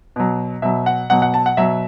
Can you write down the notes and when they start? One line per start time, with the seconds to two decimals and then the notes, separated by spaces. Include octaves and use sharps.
0.16 B2 F#3
0.62 B2 F#3 E5
0.86 F#5
1.10 B2 F#3 F#5
1.22 F#5
1.34 A5
1.46 F#5
1.57 B2 F#3 E5